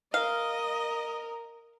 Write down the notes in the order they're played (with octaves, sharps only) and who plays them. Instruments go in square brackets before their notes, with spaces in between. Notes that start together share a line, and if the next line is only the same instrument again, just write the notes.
[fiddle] A#4 [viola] D#5 [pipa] F5